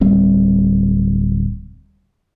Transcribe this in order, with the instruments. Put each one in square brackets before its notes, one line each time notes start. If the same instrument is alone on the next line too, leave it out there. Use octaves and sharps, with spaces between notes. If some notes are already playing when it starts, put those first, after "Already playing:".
[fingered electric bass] D1 G3 C4